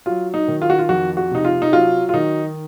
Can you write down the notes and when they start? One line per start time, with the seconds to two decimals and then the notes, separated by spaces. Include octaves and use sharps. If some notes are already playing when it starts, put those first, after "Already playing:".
0.06 F#3 F4
0.34 D#4
0.48 D#3
0.62 F4
0.70 F#4
0.79 F4
0.89 F2 F#4
1.17 F#4
1.31 C3 D#4
1.45 F4
1.62 D#4
1.72 F#3 F4
2.09 F4
2.14 D#3 D#4